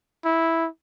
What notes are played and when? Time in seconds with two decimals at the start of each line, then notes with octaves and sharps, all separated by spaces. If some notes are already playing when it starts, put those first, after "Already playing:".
0.25 E4